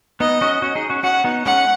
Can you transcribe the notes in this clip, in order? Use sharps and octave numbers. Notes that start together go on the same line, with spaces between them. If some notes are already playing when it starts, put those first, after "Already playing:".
B3 D#4 D#5
C#4 F#4
C#4 F#4
D#4 G#4
C#4 F#4
C#4 F#4 F#5
B3 D#4
G#3 C#4 F#5